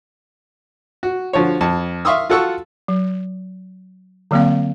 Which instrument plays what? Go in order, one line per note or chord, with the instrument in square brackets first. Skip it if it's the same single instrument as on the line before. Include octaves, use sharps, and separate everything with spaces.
[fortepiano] F#4
D3 F3 F#4 C#5
F2 A5
E5 F5 C6 C#6 D#6 E6
F4 F#4 A4 F#5 C#6 E6
[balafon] F#3
D3 F#3 A#3 C4 F5